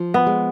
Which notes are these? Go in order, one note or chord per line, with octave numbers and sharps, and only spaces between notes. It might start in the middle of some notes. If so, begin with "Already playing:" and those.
Already playing: F3
B3
G#3